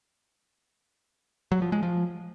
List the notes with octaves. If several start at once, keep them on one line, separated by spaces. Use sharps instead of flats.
F#3
F3
G#3
F3